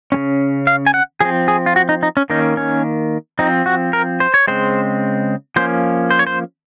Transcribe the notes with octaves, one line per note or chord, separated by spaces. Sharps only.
C#3 G#3 C#4
F5
G#5
F#5
F3 C4 G#4
G#4
F4
F#4
D#4
D#4
C#4
D#3 A#3 C#4 D#4
C#4
F3 C4 D#4
F#4
A#4
C5
C#5
C#3 G#3 C4 C5
F3 A#3 C#4 C5
C5
C#5
C5